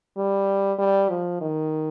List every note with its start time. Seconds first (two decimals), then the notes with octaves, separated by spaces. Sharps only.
0.17 G3
0.79 G3
1.10 F3
1.41 D#3